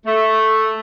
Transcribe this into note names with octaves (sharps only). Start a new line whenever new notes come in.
A3